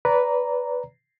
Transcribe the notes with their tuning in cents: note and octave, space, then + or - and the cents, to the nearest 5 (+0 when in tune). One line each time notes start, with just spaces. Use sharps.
B4 +0 D5 -25 A#5 +0